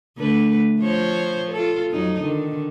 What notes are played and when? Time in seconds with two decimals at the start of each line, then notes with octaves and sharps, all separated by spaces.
0.18 D3 A3 B4
0.79 F3 C5 C#5
1.52 F4 A4
1.91 F2 F#3 D#4
2.21 D3 D#3